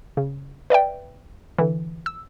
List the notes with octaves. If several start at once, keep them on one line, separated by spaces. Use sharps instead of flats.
C#3
B4 D5 E5 G5
D3 E3
E6